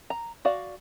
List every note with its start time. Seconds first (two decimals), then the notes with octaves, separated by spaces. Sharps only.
0.10 A#5
0.45 F#4 D5 F5